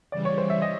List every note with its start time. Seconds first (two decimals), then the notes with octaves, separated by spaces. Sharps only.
0.12 C#3 E3 G3 D5
0.25 C#5
0.38 C5
0.50 E5
0.62 D#5